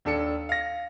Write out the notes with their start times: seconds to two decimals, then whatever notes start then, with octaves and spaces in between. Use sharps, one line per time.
0.05 D#2 D4 A4 C#7
0.49 F5 A#6